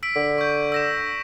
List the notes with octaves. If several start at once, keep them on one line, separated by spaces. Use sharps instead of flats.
E6 B6 D7
D3
C#6 G6
E6 A#6 E7